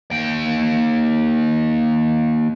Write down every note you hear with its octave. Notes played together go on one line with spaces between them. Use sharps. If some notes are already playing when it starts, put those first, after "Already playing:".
D#2 G5